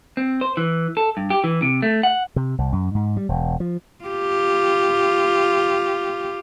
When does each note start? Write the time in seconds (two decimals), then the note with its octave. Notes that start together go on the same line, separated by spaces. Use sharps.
0.17 C4
0.41 C5
0.57 E3
0.97 A4
1.17 G2
1.30 G4
1.44 E3
1.62 C3
1.82 A3
2.03 F#5
2.36 C3
2.58 C2
2.73 F#2
2.95 G#2
3.17 G3
3.29 E1
3.60 F3
4.04 F4 G4